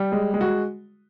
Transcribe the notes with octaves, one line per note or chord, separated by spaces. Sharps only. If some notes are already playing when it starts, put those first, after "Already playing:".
Already playing: G3
G#3
G#3
F#4